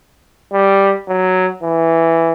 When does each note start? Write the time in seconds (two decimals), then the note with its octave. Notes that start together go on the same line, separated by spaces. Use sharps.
0.53 G3
1.08 F#3
1.63 E3